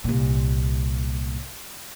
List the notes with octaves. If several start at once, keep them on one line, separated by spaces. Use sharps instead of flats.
C2 A#2